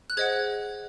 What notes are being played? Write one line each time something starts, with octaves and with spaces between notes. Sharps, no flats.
F#6
G#4 C5 D#5 F#5 G#6